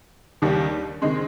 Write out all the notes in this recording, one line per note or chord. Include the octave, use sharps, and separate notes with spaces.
D#2 D#3 G3 D4
D#3 G#3 C4